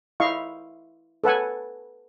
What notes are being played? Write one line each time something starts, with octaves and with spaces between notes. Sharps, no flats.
E4 D#5 F5 C#6
A4 B4 F#5 G#5